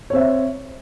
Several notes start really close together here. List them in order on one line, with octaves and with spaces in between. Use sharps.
C#5 C4 E5